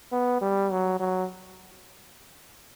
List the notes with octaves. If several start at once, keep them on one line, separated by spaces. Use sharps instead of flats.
B3
G3
F#3
F#3